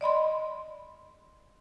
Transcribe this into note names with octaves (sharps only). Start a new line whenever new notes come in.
D5 D#5 B5 C6